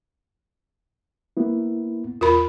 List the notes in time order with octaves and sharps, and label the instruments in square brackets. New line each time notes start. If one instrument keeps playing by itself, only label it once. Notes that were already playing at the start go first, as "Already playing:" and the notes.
[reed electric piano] A#3 B3 E4
[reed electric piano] E2 [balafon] F4 A#4 B5